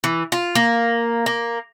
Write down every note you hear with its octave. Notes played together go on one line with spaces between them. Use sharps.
E3
F4
A#3
A#3